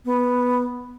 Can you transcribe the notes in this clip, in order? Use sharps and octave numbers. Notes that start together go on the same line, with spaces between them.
B3